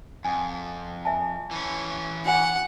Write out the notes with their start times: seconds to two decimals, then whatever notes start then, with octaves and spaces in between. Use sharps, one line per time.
0.24 F2 F#5 G#5
1.05 E5 G#5 A5
1.51 E3 C#4
2.26 F#4 F#5 G#5